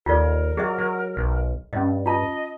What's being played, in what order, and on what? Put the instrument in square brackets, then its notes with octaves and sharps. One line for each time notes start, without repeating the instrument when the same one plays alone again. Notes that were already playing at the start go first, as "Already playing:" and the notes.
[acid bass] D#2 [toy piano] F4 A4 D5 [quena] A#4
[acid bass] F#3 [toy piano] G#4 D#5 E5
[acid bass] F#3
B1
[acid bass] G2 [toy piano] C#4 D#5
[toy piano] F4 A5 [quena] D#5